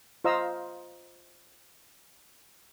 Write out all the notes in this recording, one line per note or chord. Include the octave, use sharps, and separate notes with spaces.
F4 C5 D#5 F5 A#5 E6